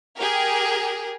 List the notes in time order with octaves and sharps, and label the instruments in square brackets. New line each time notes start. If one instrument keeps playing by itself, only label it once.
[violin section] G4 G#4 A#4